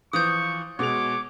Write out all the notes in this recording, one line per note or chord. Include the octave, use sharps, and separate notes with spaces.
E3 F3 C#6 D#6 G6
B2 G#3 C#5 D6 F7